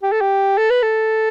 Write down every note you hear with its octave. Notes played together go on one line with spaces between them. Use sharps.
G4
A4
G4
A4
B4
A4